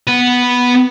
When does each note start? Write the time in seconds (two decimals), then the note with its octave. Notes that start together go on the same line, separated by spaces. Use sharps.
0.07 B3 B4